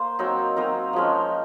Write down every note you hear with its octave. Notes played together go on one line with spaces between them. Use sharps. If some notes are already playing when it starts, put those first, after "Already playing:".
Already playing: A#3 C5
F#3 C4 D#4 A#4
F#3 C4 D#4 A#4
F3 G#3 C#4